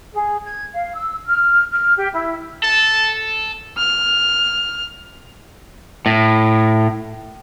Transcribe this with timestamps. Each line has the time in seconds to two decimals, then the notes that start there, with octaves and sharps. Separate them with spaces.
0.13 G#4
0.44 G#6
0.74 F5
0.95 E6
1.25 F6
1.71 F6
1.97 G4
2.13 E4
2.63 A4 A5
3.78 F6
6.06 A2